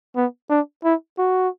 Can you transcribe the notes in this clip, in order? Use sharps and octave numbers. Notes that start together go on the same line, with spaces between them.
B3
D4
E4
F#4